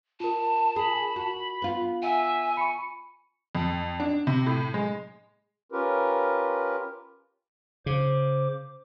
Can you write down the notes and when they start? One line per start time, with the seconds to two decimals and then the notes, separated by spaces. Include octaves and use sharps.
0.20 F4 A#4 A5
0.76 G#4 B5
1.16 F#4
1.62 B3 F4
2.02 E5 F#5 G#5
2.57 B5 C#6 C#7
3.55 F2
4.00 D4
4.27 C3
4.46 A2
4.74 G#3
5.72 C#4 F4 G4 A#4 B4
7.86 C#3 C5 D6